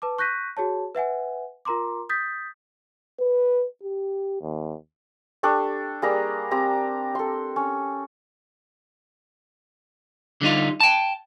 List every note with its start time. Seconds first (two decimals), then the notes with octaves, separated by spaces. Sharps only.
0.02 B4 A5 D6
0.19 C#6 F#6 G6 A#6 B6 D#7
0.57 F#4 G#4 C#5 A5
0.95 B4 E5 F#5 G#5
1.65 F4 A#4 A#5 C6 D6
2.09 D#6 G6 A6 B6
3.20 B4
3.83 G4
4.42 D#2
5.43 D4 G4 A4 C#6
6.02 G3 A#3 G#4 A#5
6.51 C4 G4 A#5
7.15 A4 C6
7.56 C#4
10.41 D3 G3 D#4 F4
10.80 G5 A5